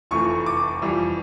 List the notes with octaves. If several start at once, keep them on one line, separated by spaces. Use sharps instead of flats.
F1 F2 E3 A3 C#6
D6
F2 E3 G3